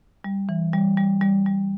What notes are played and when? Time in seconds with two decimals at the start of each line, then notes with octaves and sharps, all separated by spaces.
0.24 G3
0.49 E3
0.73 G3
0.97 G3
1.21 G3
1.46 G3